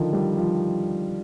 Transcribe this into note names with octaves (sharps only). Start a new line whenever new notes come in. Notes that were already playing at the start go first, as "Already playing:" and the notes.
Already playing: D3 D#3 F3
G3
F3